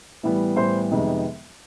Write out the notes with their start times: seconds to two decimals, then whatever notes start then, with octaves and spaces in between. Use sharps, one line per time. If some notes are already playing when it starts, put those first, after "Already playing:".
0.23 A2 E3 G3 B3
0.56 A2 E3 G3 B3 C5 C6
0.91 F2 C3 D#3 G#3 B3